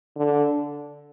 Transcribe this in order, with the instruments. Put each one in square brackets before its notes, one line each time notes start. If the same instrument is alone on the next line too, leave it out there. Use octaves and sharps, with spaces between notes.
[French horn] D3